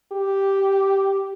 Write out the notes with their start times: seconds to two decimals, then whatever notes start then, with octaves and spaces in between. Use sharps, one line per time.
0.12 G4